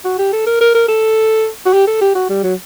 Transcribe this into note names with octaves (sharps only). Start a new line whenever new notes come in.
F#4
G4
A4
A#4
A#4
A#4
A4
F#4
G4
A4
G4
F#4
G3
F#3